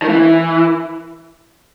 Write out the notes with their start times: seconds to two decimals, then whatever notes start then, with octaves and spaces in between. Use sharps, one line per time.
0.02 D#3
0.09 E3